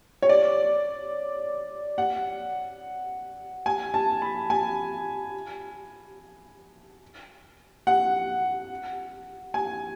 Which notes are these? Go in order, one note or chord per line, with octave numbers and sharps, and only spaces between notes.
C#5
D5
F#5
G#5
A5
B5
G#5
F#5
G#5